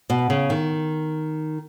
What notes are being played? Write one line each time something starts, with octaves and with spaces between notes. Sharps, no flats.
B2
C#3
D#3